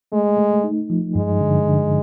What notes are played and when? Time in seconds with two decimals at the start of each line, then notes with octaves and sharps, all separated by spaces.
0.13 G#3 A3
0.39 A3
0.64 D#4
0.90 F3
1.15 G2 G#3
1.41 D3
1.67 D3